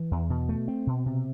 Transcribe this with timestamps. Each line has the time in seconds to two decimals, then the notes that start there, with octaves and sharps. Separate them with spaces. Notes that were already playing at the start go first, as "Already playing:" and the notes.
Already playing: E3
0.11 E2
0.30 B2
0.49 A3
0.68 C4
0.87 B2
1.06 C3